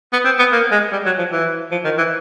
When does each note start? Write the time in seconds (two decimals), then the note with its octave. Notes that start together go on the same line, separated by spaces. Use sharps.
0.13 B3
0.25 C4
0.39 B3
0.52 A#3
0.71 G#3
0.92 G3
1.06 F#3
1.19 F3
1.32 E3
1.71 F3
1.84 D#3
1.98 E3